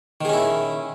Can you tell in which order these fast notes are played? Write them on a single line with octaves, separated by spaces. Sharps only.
D#3 G#4 C#4 E4